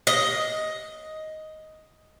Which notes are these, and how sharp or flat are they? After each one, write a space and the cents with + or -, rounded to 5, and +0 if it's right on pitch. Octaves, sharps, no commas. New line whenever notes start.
D#5 +5